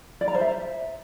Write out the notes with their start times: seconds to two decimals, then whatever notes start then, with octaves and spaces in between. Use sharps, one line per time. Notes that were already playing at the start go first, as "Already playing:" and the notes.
0.21 D5
0.28 A#5
0.35 C5
0.41 E5